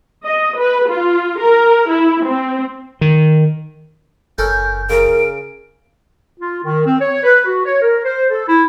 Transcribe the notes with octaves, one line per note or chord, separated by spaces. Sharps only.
D#5
B4
F4
A#4
E4
C4
D#3
F#1 C#4 A4 A#4 G6
C#3 A#4 D7
F4
D#3
C4
C#5
B4
F#4
C#5
A#4
C5
A4
E4